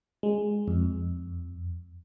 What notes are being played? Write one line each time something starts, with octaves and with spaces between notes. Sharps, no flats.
G#3
F2